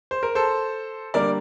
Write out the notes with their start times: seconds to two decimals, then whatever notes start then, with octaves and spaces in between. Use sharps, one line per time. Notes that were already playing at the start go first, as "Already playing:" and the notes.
0.11 C5
0.23 A#4
0.35 A4 C5
1.14 D3 G3 A#3 A#4 D5